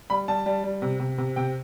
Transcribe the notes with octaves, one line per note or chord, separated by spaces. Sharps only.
G3 B5
G3 A5
G3
G3
C3
C3
C3
C3 G5